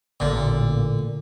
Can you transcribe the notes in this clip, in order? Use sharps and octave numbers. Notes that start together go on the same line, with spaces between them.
A1 A#2 D3